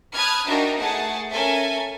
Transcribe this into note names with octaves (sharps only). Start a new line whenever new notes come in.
A5 B5 D#6 F6 F#6 G#6
D4 D#4 F#4 A#4 E5 G5
A3 G#4 F#5 A5
C#4 A4 A#4 E5 G#5